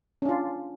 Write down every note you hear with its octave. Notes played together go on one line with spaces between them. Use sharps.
C#4 D4 F4